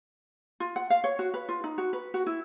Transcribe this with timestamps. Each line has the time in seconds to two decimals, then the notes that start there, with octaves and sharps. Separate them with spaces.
0.60 F4
0.76 F#5
0.90 F5
1.04 C#5
1.19 F#4
1.34 B4
1.49 F4
1.64 D#4
1.78 F#4
1.93 B4
2.14 F#4
2.27 E4